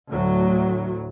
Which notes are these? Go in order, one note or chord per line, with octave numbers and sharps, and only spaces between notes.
D2 A2 F#3